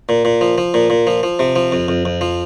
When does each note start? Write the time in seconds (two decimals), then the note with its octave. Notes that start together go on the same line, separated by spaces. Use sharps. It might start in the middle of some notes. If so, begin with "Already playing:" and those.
0.09 A#2
0.25 A#2
0.41 F3
0.58 F3
0.74 A#2
0.90 A#2
1.07 F3
1.23 F3
1.39 C3
1.56 F3
1.72 F2
1.88 F2
2.05 F2
2.21 F3